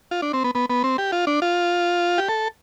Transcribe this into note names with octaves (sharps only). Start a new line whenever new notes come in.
F4
D4
C4
B3
B3
B3
C4
G4
F4
D4
F4
G4
A4